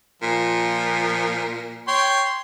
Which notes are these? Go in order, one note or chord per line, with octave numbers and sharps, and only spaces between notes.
A#2 F3
C#5 G5 C6